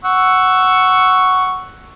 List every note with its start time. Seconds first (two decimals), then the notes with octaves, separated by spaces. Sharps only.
0.05 F#5 C#6 E6